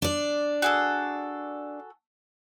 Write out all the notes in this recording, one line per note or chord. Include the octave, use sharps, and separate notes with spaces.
D4 D5
F#4 G#4 A4